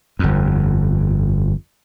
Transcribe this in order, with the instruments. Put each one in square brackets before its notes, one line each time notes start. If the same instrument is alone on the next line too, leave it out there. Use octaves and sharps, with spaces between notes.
[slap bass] G1 F2